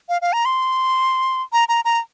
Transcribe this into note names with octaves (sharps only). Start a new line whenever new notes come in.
F5
F5
A#5
C6
A#5
A#5
A#5